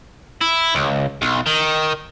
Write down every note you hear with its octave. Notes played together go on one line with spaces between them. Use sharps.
E4
C#2
B1
D#3